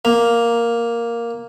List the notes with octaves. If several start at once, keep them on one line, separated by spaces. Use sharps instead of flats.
A#3